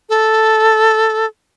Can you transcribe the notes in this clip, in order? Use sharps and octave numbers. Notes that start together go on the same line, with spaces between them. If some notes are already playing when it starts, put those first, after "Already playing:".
A4